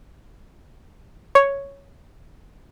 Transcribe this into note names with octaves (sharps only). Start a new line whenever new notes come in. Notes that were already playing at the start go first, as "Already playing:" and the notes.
C#5